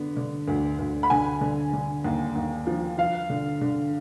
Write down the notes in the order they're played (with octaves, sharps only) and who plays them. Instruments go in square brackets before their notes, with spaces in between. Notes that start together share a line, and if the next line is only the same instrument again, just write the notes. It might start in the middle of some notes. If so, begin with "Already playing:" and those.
Already playing: [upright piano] D3 B3
D3
D2
D2
B5
D3 G#5
D3
D3
D#2
D#2
F3
F3 F5
D3
D3